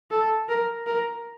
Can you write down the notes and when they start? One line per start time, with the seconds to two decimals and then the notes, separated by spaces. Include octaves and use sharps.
0.11 A4
0.49 A#4
0.86 A#4